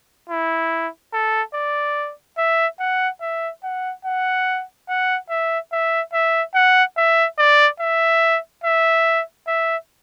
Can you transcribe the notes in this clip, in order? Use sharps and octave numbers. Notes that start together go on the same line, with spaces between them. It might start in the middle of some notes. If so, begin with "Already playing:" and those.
E4
A4
D5
E5
F#5
E5
F#5
F#5
F#5
E5
E5
E5
F#5
E5
D5
E5
E5
E5